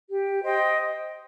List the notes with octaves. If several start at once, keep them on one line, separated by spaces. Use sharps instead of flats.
G4
C5 D#5 G5